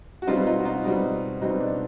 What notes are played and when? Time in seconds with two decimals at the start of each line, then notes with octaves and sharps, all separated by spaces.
0.22 F#4
0.27 B2 G3 C4 D#4 F4
0.46 D#4 F4
0.59 F#4
0.65 D#4 F4
0.84 B2 G3 C4 D#4
1.42 B2 G3 C4 D#4
1.60 D4